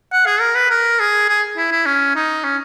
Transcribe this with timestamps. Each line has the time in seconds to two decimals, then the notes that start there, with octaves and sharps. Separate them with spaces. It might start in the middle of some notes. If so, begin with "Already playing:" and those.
0.13 F#5
0.26 G#4
0.41 A#4
0.55 B4
0.70 A#4
1.00 G#4
1.29 G#4
1.57 E4
1.72 E4
1.86 C#4
2.16 D#4
2.44 C#4